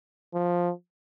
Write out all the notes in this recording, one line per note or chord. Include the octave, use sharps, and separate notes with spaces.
F3